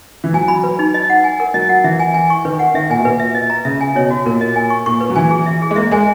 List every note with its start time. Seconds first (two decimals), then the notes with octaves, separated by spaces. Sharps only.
0.24 E3
0.33 F#3 G#5
0.48 B5
0.63 B4
0.79 D#4
0.94 D#5
1.10 F#5
1.24 G#5
1.40 A#4
1.54 F#3 D#5
1.69 F#5
1.84 E3 E5
2.00 G#5
2.14 G#5
2.30 C#6
2.45 D#3 B4
2.59 F#5
2.74 D#3 E5
2.90 A#2 G#5
2.99 B2
3.05 A#2 B4
3.20 E5
3.35 D#5
3.50 A#5
3.65 C#3 E5
3.81 G#5
3.95 B2 C#5
4.11 F#4
4.25 A#2 A#4
4.41 D#5
4.56 G#5
4.70 C#6
4.86 A#2 C#6
5.01 B4
5.10 F#3
5.16 E3 G#5
5.31 G#4
5.46 E5
5.62 G#4
5.71 G#3
5.76 A#3 E5
5.91 G#3 G#5